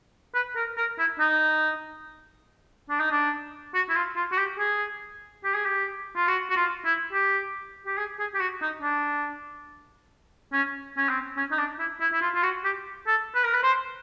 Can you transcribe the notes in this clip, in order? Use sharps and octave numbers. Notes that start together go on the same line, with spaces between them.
B4
A#4
A#4
E4
D#4
D4
D#4
D4
F#4
E4
F4
F4
F#4
G4
G#4
G4
G#4
G4
F4
F#4
F#4
F4
E4
G4
G4
G#4
G#4
G4
F#4
D#4
D4
C#4
C#4
C4
C#4
D#4
D4
E4
E4
E4
F4
F4
F#4
G4
A4
B4
A#4
B4
C5